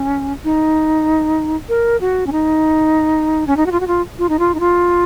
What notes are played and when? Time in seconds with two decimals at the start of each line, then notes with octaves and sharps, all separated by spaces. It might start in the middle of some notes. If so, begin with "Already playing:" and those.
Already playing: C#4
0.44 D#4
1.69 A#4
2.00 F#4
2.26 C#4
2.32 D#4
3.47 C#4
3.57 D#4
3.66 F#4
3.72 F4
3.80 F#4
3.87 F4
4.18 F4
4.29 D#4
4.39 F4
4.54 D#4
4.60 F4